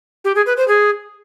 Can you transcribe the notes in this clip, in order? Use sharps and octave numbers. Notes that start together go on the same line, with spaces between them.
G4
G#4
B4
C5
G#4